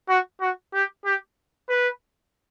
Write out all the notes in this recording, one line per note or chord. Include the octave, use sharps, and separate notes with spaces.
F#4
F#4
G4
G4
B4